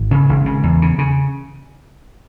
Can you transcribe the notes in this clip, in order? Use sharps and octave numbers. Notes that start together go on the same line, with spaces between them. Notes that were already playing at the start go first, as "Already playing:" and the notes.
Already playing: G#1
C#3 C#4
G#1
C#3
E2
C#3
C#3